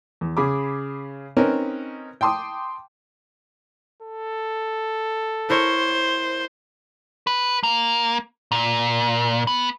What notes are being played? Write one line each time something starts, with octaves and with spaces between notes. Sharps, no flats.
E2
C#3 G#4 B5 D6
C4 C#4 D#4 A#4 B4
G5 A5 C6 D6 D#6
A4
E4 A#4 C5 C#5
B4
A#3
A#2
B3